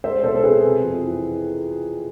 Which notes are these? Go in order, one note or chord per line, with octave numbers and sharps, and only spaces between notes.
G#3 C5 E5
B2 A4 C5
A4
C4 G#4 B4
C3
F2
E3